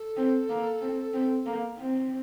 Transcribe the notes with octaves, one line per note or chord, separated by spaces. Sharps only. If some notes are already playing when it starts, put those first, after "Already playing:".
Already playing: A4
C4
A#3
C4
C4
A#3
C4